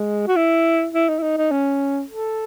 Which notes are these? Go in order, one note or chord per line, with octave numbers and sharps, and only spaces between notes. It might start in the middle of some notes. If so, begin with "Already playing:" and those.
Already playing: G#3
F#4
E4
E4
D#4
E4
D#4
D#4
C#4
A4